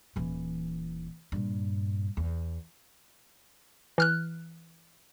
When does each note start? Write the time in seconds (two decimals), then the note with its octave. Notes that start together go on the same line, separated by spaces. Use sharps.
0.16 D#1 E3
1.32 G2 A#2
2.17 E2
3.98 E3 F6 F#6